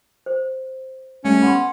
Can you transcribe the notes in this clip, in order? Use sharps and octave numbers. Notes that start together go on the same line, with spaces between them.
C5
G3 A3 C#4
B3 F#5 B5 C6